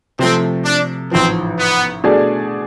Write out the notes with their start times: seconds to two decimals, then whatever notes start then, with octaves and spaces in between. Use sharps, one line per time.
0.19 C3 F3 A3 C4
0.65 D4
1.11 A1 G#2 F3 C4
1.58 B3
2.04 B2 A3 D4 G#4 D5